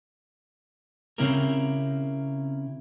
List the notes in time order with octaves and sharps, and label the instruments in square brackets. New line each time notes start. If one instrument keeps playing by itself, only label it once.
[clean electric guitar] C#3 C4 C#4 E4 G4 A#4